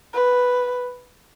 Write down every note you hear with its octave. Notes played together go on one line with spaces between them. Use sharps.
B4